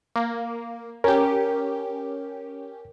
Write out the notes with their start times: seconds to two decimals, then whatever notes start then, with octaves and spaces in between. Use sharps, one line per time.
0.16 A#3
1.04 C#4 G4 A#4